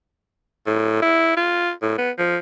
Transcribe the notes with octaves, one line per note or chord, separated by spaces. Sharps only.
A2
E4
F4
A2
B3
F3